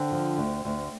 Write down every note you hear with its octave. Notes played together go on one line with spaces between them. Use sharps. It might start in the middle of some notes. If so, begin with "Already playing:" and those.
Already playing: D3 C4
F3
D2
D2